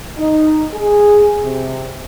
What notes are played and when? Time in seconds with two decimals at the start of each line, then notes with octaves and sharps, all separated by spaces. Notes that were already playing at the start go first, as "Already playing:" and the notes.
0.18 D#4
0.74 G#4
1.44 C3